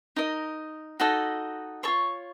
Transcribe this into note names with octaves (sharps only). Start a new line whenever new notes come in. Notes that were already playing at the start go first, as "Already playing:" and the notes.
D#4 A#4 D#5
D#4 F#4 A4 D#5
F4 A4 C#5 C#6